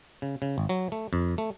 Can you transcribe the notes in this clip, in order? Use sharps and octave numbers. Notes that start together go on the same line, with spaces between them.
C#3
C#3
G#1
F#3
A3
F2
A3